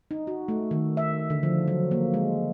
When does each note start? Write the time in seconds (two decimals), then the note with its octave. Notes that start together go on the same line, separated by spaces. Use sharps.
0.11 D#4
0.27 F#4
0.48 A3
0.71 D#3
0.97 E5
1.30 D3
1.43 F3
1.68 F#3
1.91 A#3
2.14 G#3